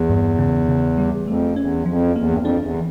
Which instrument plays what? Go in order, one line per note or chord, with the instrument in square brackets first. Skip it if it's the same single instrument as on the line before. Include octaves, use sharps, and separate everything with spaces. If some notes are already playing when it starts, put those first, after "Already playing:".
Already playing: [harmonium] E2
[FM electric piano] G2
C#3
C#3
G3
[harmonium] F2 [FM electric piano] A3
[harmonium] E2 [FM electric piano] C#4
[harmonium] F2 [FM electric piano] F3
[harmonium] E2 [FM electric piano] A#3
[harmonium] G2
F2
[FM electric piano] D4
[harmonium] E2
[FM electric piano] E3